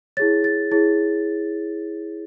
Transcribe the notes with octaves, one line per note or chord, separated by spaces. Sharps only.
E4 G#4 C#5 A6
A6
E4 G#4 C#5 A6